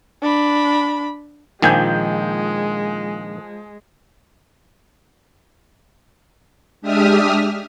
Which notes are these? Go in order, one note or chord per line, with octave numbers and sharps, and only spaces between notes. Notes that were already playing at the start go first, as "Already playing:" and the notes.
D4 B5
A#1 D#3 F3 G#3 G#5 G6
G#3 D4 G4 E5 D#6 F6